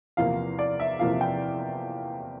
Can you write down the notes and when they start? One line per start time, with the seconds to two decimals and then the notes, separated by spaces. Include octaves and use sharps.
0.17 E2 C3 F3 A#3 F5
0.59 D5
0.80 E5
0.99 E2 C3 F3 A#3 F5
1.21 G5